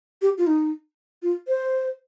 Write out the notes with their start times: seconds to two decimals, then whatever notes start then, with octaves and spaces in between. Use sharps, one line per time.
0.22 G4
0.38 F4
0.47 D#4
1.22 F4
1.48 C5